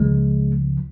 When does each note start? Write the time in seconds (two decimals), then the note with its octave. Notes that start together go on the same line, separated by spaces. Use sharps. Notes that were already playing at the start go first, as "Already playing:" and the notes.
Already playing: C#2 C#3 F3 G#3